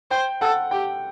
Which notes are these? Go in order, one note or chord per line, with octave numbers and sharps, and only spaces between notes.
C5 G5
A4 F#5
G4 G5